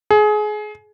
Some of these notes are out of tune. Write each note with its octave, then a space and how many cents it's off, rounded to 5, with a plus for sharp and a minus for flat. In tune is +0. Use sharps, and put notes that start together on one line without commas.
G#4 +25